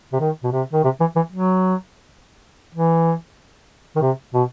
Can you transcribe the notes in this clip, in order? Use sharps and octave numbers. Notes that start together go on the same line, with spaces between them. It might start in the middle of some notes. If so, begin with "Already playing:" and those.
C3
D#3
B2
C3
D#3
C3
E3
E3
F#3
E3
D#3
C3
B2